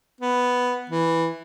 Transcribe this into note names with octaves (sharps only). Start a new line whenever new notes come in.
B3
E3